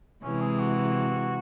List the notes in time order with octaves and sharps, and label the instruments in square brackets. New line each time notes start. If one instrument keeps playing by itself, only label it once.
[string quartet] C3 E3 G#3 [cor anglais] C#4
[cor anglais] G#4
F#4